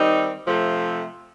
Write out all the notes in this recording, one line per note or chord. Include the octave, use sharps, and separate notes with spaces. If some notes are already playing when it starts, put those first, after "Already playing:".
Already playing: D#3 G3 C4 D#4
C3 F3 A3